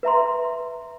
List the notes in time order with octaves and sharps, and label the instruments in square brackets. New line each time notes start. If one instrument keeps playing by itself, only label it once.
[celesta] B4 E5 A#5 C6